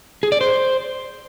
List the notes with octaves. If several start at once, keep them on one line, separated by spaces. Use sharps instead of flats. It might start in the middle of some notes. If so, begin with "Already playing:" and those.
G#4
D5
C5